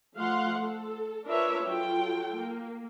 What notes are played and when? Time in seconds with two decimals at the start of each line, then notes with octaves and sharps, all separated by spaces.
0.15 F3 A3 F5 F#5 C6
0.59 A4
1.27 D4 F4 A#4 B4 C#5 E5
1.66 F#3 F4 A4 G5
2.35 A#3